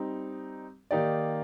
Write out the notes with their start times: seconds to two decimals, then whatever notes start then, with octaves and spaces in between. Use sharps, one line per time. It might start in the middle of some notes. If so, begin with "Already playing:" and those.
Already playing: G3 C4 D#4
0.91 D#3 A#3 D#4 G4 D5